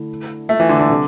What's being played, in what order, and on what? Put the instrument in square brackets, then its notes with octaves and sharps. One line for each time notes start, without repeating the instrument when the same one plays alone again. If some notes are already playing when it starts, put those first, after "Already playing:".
Already playing: [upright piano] D3 A3 E4
[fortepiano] A3
E3
D3
D3
[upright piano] C3 G3 D4 A4